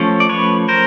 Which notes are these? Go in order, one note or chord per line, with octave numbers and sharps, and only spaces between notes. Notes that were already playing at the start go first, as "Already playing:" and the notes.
Already playing: F3 A3 C#4
D5
B4 C#5
A#4 C5